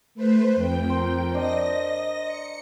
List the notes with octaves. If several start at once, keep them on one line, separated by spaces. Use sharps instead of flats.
A3 B4 C5
F2 G5
A#4 C5
D4 C5 D#5 A#6
C#7